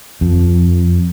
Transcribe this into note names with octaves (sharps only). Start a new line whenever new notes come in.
F2